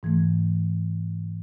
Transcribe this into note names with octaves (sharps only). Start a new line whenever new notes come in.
G#2 E3 A3